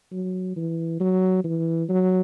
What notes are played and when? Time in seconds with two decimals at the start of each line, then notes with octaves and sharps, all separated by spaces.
0.12 F#3
0.56 E3
1.00 F#3
1.44 E3
1.89 F#3